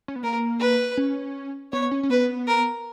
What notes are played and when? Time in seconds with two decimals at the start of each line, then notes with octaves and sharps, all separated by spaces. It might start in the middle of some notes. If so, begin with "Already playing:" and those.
0.08 C#4
0.16 B3
0.23 A#3 A#4
0.60 B4
0.97 C#4
1.72 B3 C#5
1.91 C#4
2.03 C#4
2.10 B3 B4
2.48 A#4